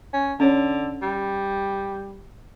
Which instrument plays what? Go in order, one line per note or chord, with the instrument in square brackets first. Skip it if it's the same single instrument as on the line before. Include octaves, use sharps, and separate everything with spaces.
[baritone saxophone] C#4
[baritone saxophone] D3 [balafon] C#4 C#5
[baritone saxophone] G3